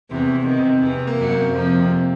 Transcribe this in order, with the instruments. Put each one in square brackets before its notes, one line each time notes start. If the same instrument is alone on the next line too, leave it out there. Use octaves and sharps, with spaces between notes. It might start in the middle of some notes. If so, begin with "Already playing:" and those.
[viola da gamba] E2 E3 [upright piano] C3
[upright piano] C3
[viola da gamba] D#3
[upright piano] C3
[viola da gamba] E2 E3 [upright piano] C3
[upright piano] A#3
[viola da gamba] F#2 F#3
[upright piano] A#3
[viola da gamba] F2 F3 [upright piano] C3
[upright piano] C3